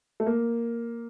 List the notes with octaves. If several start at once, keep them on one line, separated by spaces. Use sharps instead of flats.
A3
A#3